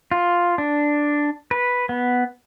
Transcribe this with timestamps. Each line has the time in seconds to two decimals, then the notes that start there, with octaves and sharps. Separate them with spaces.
0.11 F4
0.58 D4
1.51 B4
1.89 B3